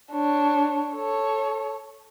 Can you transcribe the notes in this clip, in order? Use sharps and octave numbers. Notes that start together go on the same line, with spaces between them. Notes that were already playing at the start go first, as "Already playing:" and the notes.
D4 C#5
A4 C#5